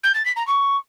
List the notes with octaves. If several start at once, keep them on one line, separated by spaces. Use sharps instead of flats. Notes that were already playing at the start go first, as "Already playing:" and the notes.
G6
A6
B6
A#5
C#6